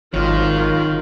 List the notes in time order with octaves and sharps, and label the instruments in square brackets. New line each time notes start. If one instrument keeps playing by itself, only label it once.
[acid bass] G#1 [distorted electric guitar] D#3 [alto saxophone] F#3 [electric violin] F4 A#4